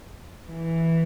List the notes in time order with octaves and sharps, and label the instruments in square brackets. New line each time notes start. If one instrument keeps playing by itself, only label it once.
[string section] E3